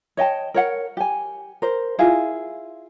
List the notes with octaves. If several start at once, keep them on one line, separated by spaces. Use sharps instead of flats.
C#5 D#5 G5 A5
A#4 C#5 F#5
G4 G#5
A#4 C5
E4 F4 G#4 F5